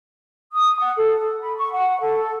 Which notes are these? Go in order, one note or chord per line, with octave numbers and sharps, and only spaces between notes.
D#6
F#5
A4
B5
C#6
F#5
A4